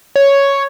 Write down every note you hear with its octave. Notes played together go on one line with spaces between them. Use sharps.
C#5